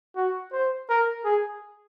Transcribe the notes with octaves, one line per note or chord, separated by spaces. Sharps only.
F#4
C5
A#4
G#4